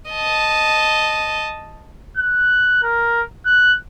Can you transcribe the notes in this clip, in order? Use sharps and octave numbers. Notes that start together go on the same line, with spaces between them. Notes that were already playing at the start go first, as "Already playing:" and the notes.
D#5 A5
F#6
A#4
F#6